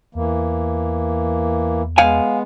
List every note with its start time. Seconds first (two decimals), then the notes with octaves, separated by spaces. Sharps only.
0.15 E2 E3 A#3
1.98 G#3 B3 F5 G#5